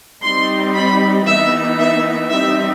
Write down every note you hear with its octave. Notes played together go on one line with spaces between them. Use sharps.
G3 C4 D#4 C6
B5
E3 B3 D#4 E5
E5
G3 C4 D#4 E5